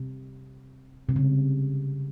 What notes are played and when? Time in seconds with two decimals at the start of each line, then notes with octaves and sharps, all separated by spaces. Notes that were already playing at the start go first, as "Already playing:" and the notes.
Already playing: C3
1.09 C3
1.16 C#3